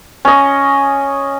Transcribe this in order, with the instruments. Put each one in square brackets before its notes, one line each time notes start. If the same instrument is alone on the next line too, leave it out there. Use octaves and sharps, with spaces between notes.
[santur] C#4 D#5